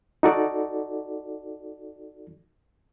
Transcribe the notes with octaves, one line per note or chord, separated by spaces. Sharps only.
D#4 F#4 A4 D5